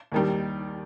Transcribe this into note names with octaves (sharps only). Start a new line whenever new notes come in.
D#2 D#3 G3